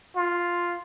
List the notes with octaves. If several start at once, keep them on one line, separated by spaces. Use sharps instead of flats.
F4